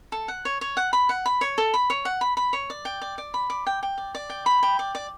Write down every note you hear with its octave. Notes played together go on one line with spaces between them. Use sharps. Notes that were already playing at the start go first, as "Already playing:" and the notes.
A4
F#5
C#5
C#5
F#5
B5
F#5
B5
C#5
A4
B5
C#5
F#5
B5
B5
C#5
D5
G5
D5
D5
B5
D5
G5
G5
D5
D5
G5
B5
G5
D5
D5